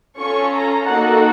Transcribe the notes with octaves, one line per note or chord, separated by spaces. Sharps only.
C#4 F4 A4 C#6
A#5
A#3 D#4 F#4 A4 F#5